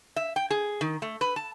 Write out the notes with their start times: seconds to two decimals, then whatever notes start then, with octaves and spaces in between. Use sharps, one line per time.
0.16 E5
0.36 G5
0.50 G#4
0.81 D#3
1.02 A3
1.21 B4
1.36 A5